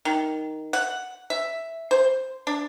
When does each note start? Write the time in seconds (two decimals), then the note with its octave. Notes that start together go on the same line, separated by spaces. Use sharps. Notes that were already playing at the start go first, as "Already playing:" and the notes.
0.05 D#3
0.73 F#5
1.30 E5
1.91 C5
2.47 D4